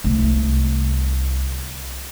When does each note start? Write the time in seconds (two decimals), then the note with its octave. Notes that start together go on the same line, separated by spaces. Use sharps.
0.04 C2 A3